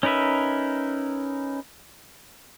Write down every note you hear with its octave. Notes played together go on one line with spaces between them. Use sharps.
C#4 D#4 A#4 B4 E5